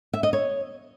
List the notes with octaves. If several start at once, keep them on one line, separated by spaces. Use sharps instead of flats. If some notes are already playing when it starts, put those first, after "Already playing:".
E5
D#5
C#5